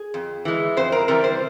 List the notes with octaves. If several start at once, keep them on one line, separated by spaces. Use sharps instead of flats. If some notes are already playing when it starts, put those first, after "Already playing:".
Already playing: G#4
F2
E3 G#3
F2 C5
A#4
C3 E3 G3 A#4
C5